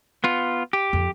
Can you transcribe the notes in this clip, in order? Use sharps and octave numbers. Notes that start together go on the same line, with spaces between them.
B3 F4
G4
F2